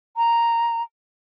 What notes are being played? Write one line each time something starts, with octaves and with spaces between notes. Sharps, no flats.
A#5